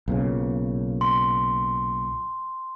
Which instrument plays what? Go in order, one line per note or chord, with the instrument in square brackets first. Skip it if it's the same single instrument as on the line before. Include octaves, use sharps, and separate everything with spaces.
[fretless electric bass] B1 A#2 C#3
[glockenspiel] C6